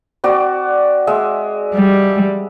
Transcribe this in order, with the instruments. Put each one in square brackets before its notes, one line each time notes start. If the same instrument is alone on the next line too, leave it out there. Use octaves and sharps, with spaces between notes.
[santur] C4 F#4 D5
G#3 E5
[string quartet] G3